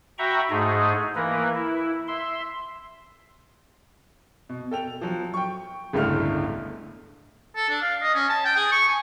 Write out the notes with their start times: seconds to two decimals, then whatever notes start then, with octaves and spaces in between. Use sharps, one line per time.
0.18 F#4 E5 G5 A#5 B5 C#6
0.50 G#2 A3 D#4 G#4
1.16 E3 A#3 A#4 B4
1.55 E4
2.07 E5 C6
4.49 B2
4.71 A4 G5 F7
5.01 F3 F#3
5.34 G5 C#6
5.93 G1 C#2 A2 D3 A3 F6
7.56 A4
7.69 D4
7.82 F5
8.02 D#5
8.15 C#4
8.29 A5
8.45 G5
8.56 G#4
8.72 C#6
8.88 G#5